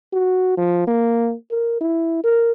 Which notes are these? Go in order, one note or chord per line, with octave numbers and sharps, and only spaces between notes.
F#4
F3
A#3
A#4
E4
A#4